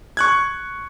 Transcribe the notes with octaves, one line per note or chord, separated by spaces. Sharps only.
C#6 F#6 G#6